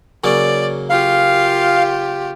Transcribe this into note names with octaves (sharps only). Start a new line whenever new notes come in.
C#3 F#3 A#3 D5
F4 G4 F5